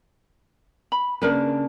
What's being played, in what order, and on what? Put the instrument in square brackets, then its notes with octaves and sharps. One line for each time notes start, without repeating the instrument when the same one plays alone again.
[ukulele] B5
[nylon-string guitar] C#3 A#3 D4 [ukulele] A#4 B4